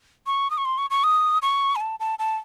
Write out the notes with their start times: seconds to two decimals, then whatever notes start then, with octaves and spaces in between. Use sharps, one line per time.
0.26 C#6
0.50 D#6
0.58 C#6
0.65 C6
0.78 C#6
0.90 C#6
1.04 D#6
1.42 C#6
1.76 G#5
1.80 A5
2.00 A5
2.19 A5